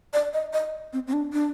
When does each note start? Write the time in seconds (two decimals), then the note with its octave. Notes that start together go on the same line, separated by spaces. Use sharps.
0.13 D5
0.34 D#5
0.53 D#5
0.93 C4
1.07 C4
1.13 D4
1.33 D4